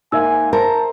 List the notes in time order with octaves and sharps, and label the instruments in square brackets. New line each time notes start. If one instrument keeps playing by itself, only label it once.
[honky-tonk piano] G#2 A#3 [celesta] E5 E6 [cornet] G#5
[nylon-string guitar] A#4 [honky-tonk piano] C5 A#5 [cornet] A5